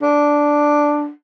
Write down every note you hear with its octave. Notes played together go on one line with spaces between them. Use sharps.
D4